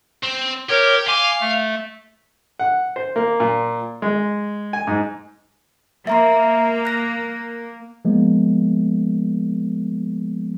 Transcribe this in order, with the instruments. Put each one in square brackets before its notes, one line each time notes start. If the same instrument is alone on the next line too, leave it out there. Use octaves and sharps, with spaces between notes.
[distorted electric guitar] C4
[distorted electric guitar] G4 [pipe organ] A#4 C#5
[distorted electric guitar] F5 [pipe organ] G#5 C6 D6
[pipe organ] A3
[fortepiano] F#5
C5
A#3
A#2
G#3
G#5
G#2
[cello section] A#3 [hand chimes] E5 A#5 C6
[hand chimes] F#6 A#6
[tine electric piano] F3 G#3 A#3 B3